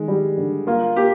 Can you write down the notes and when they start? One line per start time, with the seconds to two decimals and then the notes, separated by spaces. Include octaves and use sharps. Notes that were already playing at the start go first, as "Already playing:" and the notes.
Already playing: D#3 G#3
0.08 G3
0.37 D3
0.67 A#3 F4
0.96 A#3 G4